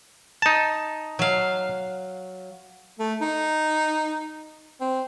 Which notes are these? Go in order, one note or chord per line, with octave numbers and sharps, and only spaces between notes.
D#4 A5
F#3 F5
A3
D#4
C4